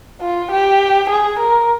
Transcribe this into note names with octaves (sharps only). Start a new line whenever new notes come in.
F4
G4
G#4
A#4